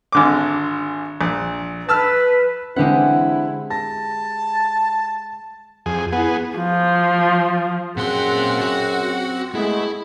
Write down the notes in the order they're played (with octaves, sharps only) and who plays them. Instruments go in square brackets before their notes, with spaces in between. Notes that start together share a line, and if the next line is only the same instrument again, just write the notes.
[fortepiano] G#1 D3 D6
A#1
[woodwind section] B4 [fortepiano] A5 E6 F6
[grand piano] D3 E3 C4 [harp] G#3 G4 F#5 [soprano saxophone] E4
[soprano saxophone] A5 [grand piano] A#6
[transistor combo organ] F2 G#4
[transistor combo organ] B3 G#4 [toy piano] E4 F#5
[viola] F3
[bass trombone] F#2 [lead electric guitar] A#2 C6 [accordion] C4 F#5 [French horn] G#4
[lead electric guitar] F#4
[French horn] G#3 [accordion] A3 B3 G#4 [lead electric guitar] E4